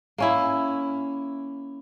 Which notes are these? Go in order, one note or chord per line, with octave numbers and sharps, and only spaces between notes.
A#3 C#4 E4